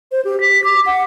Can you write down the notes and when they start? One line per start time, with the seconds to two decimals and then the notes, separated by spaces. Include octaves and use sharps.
0.12 C5
0.25 G4
0.41 B6
0.64 D6
0.86 F#5